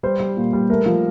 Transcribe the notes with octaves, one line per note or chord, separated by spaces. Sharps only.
G3 C5
G3
A#2
G3
A3 A#4
F3